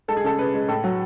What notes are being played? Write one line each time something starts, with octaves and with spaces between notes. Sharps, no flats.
G#3 A4
G#4
C#3 A4
C#3 B4
G#3
A2 A4
F#3